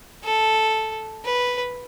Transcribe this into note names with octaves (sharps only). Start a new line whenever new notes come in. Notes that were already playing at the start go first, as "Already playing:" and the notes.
A4
B4